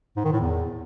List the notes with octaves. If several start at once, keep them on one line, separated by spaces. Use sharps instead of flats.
G#2
D#3
A2
E2